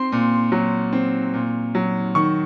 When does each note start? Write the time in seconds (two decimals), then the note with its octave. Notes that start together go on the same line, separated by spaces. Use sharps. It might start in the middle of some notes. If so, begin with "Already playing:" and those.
Already playing: C4 C6
0.12 A#2
0.52 F#3
0.93 C4
1.34 A#2
1.75 F#3
2.15 D#3 C#6